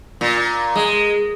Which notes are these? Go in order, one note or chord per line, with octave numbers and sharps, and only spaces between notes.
A#2
G#3